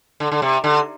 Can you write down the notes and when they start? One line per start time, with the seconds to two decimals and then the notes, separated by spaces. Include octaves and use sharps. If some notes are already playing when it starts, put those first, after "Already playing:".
0.20 D3
0.32 D3
0.42 C3
0.64 D3